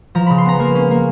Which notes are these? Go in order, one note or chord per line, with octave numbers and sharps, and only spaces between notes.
F3 A#5
C#3 B5
C6
B3 A#5
A#3
C#4
A#3